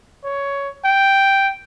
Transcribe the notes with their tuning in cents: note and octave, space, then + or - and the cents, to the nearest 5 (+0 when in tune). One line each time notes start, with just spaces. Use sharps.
C#5 +10
G5 +0